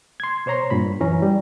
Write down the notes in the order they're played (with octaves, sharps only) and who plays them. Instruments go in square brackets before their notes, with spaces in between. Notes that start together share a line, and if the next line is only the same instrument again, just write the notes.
[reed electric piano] C6 G#6
B2 C5 C#5 A#5 C6
G2 A#2 B5
F#2 E3 C#4 A#5
G3